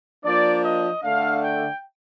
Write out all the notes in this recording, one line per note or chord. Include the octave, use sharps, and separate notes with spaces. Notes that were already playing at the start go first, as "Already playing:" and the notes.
F3 A#3 D4 D5
D#5
D3 A3 D4 F5
G5